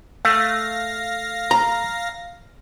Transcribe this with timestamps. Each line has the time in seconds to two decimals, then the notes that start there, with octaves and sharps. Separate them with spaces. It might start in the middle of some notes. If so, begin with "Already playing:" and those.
0.25 A3 F5 A#6
1.51 A#5